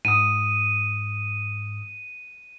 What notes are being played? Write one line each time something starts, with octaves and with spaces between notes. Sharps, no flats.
G#2 D#6 D#7